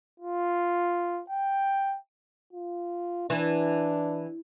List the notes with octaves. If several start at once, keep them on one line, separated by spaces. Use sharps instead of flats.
F4
G5
F4
E3 D4